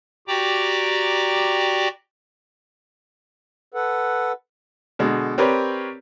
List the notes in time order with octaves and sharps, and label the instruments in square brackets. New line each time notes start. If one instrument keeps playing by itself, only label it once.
[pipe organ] F#4 G4 D5 G5 A#5 D6
[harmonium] A4 B4 F#5
[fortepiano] B2 D3 G#3
C4 G4 A#4 B4 C#5 D5